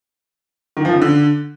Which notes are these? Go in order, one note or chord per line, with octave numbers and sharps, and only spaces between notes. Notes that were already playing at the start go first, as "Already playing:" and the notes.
D#3
F3
C#3
D3